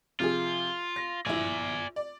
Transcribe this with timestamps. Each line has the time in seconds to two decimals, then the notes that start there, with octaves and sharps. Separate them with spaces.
0.20 C3 F3 F4 G#4
0.96 A#6
1.26 A#1 E4 D5 G#5
1.96 D5